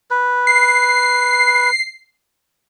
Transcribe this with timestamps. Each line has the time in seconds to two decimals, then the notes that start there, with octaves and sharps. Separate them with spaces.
0.11 B4
0.47 C7